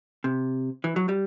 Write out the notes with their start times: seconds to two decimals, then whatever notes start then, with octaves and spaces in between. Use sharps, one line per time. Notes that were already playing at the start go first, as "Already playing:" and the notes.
0.24 C3
0.84 E3
0.96 F#3
1.09 G3